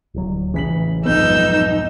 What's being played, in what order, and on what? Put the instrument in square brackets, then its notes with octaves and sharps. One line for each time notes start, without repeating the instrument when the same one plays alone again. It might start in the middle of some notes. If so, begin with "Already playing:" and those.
[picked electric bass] D1 F#3
[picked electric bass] A1 E3 [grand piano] C#3 B6 F#7
[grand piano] B1 F2 G#2 [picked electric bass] B3 [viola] D#4 [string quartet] E6 G6